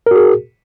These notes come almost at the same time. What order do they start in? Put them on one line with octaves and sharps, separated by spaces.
A#4 F#4 G#4